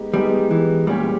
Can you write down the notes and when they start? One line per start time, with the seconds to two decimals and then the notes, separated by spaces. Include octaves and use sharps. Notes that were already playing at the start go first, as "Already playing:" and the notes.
Already playing: G#3 B3 D#4 G4
0.14 G3 G#3 B3 D#4 G4
0.51 E3
0.87 A#2 G3 G#3 C#4 G4 C#5